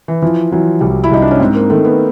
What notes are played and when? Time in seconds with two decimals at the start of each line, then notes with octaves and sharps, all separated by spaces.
0.08 E3
0.22 E3 F3
0.52 E3 F#3
0.81 C2 G3
1.04 E4
1.11 C2 D#4
1.22 D4
1.31 C#4
1.40 G#2 C4
1.55 A#3
1.70 D#3 A3
1.85 B3